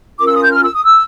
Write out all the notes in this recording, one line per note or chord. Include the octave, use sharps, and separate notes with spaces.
C#4 F4 A#4 D6
E6
D#6
G6
F6
E6
D#6
E6